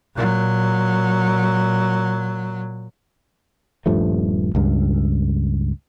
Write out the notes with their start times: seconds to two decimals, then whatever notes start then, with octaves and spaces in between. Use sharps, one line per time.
0.15 A#2 F#3
3.86 D#1 G2 F3 A3
4.55 C#2 G2